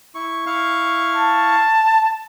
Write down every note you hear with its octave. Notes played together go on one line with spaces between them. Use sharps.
E4 C#6
E4 F5 C#6
A5